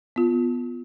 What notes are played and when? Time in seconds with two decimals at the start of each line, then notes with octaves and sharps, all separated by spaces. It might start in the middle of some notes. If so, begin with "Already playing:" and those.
0.16 B3 F4